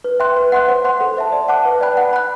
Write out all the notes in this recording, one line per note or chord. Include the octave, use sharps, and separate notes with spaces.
B4
E5 G5 C6 F#6
B4
F#5 C6 F#6
C5
F#5 C6
A4
C5 E5 A5
D5
F#5 A5 D6 F#6
B4
D5 G5 B5 F#6
F#5
B5 F#6